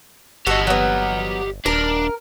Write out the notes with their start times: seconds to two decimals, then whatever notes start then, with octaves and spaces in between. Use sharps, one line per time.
0.47 G1 F#4 G4 A4 D#5
0.67 F#3 B3
1.66 D#1 D4 A#4